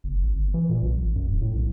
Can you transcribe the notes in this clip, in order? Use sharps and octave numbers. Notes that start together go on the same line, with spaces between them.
F#1
G#1
G1
E3
A#2
B1
A1
F#2
D1
A2
B1